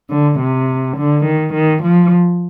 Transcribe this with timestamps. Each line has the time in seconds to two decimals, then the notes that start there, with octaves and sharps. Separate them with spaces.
0.09 D3
0.38 C3
0.96 D3
1.24 D#3
1.54 D#3
1.82 F3